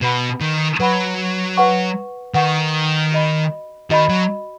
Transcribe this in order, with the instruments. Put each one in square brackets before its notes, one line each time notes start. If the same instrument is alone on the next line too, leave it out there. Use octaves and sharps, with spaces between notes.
[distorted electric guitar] B2 [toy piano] B4 F#5 B5
[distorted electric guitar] D#3
[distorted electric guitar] F#3 [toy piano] B4 F#5 B5
[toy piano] B4 F#5 C#6
[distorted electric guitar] D#3 [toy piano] B4 F#5 C#6
[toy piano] F#4 D#5 B5
[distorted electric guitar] D#3 [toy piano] F#4 D#5 B5
[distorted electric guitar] F#3